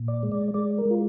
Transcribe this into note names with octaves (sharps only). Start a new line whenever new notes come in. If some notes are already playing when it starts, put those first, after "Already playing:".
Already playing: A#2
D5
G#3
D5
G#3 D5
A#4
G#3
F4